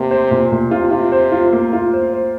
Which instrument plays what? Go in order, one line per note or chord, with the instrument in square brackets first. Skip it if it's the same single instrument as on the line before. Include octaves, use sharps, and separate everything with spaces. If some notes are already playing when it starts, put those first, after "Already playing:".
Already playing: [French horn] C3 [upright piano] A#3
[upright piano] C5
A#2
A#2
[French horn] C3 [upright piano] F4
[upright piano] F4
C5
F4
A#3
F4
C5
C5